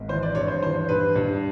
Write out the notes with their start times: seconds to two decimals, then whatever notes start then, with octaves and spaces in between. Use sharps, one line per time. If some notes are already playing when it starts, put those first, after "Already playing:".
Already playing: G#1
0.09 E3 C5
0.23 D5
0.35 G2 C#5
0.48 C5
0.63 E3 C5
0.89 G2 B4
1.16 G2